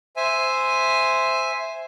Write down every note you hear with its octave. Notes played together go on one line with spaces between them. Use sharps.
C5 E5 G#5